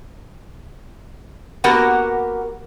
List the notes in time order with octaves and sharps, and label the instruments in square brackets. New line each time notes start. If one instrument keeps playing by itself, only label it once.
[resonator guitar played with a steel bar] A#3 B3 F#4 G4 A#4 F#5